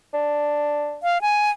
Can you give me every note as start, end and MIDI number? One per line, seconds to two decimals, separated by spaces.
0.14 0.99 62
1.03 1.21 77
1.22 1.50 80